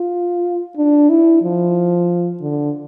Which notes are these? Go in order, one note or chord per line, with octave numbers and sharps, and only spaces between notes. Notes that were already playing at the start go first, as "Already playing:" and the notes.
Already playing: F4
D4
E4
F3
D3